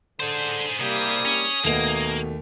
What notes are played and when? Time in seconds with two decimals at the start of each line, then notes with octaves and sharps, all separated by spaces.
0.20 D3 G#4 C5
0.80 C2 C3 G3 A#3 G4 G#4 D#6
1.25 C#4
1.64 D#2 B2 A3 A#3 F7